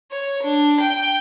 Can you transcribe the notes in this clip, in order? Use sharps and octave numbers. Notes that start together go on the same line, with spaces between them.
C#5
D4
G5